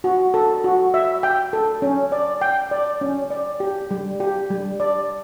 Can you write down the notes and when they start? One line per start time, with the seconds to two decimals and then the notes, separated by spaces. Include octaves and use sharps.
0.04 F#4
0.34 A4
0.64 F#4
0.94 E5
1.23 G5
1.53 A4
1.82 C#4
2.12 D5
2.41 G5
2.71 D5
3.01 C#4
3.30 D5
3.60 G4
3.91 G3
4.20 G4
4.50 G3
4.80 D5